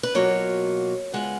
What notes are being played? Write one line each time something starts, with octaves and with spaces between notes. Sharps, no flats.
B4
B2 F#3 A#3 F4 C#5
C#3 G#3 B3 F4 F#5